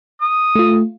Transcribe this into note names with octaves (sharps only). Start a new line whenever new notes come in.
D#6
A3 F4